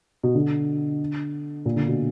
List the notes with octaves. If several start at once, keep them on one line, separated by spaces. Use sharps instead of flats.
B2
D3
A#2
D3
B2